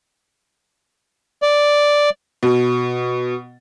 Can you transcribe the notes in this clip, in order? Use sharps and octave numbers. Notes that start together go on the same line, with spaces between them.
D5
B2